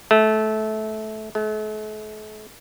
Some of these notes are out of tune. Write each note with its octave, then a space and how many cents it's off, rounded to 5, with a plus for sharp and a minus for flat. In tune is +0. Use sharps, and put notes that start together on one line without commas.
A3 -20
A3 -45